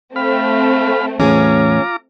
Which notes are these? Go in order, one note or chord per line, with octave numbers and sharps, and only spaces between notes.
A3 C4 F5 B5
E2 A2 C#4 F4 G#4 A#5 D6